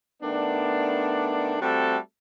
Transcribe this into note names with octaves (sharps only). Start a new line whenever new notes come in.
D#3 A3 B3 D4
G3 A3 C4 F#4 A4